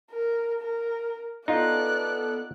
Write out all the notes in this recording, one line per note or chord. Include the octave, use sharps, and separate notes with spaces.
A#4
A#4
B3 D#4 F4 A4 D5 F#6